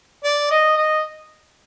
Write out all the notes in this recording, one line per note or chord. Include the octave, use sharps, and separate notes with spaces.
D5
D#5
D#5